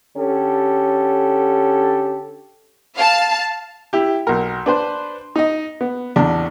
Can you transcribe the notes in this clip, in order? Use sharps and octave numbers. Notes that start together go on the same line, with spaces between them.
D3 C#4 G4 A4
F5 A5
E4 G4
B1 A#4
D4 B4 C5
D#4 D#5
B3
A1 E2 D4